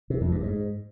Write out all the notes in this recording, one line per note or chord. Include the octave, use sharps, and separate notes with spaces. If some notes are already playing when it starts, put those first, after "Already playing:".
C3
F2
G2
G#2